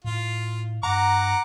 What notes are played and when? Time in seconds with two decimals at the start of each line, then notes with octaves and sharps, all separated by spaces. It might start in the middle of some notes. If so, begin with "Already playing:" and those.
0.04 A2 F4
0.83 G2 F#5 A#5 D6